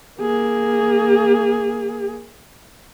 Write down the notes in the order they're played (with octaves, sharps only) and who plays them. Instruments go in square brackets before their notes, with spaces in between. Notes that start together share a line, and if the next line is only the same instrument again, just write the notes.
[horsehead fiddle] A#3 G#4